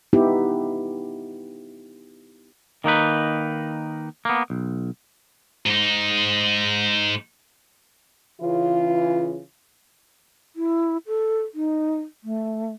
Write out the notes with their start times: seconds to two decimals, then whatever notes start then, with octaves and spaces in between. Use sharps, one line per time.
0.13 B3 D#4 E4 G4
2.84 D#3 A#3 D#4 B4
4.25 A#3 B3
4.50 B1
5.66 G#2 D#4
8.40 C#3 E3 F4
10.56 E4
11.07 A4
11.54 D#4
12.24 A3